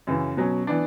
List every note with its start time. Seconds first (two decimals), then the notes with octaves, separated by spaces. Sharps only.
0.07 F#2 C#3 E3
0.37 B2 F#3 C#4
0.67 E3 B3 D4